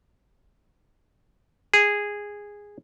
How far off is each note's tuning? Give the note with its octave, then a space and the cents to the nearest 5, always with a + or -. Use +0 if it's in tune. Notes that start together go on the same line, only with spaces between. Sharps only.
G#4 -10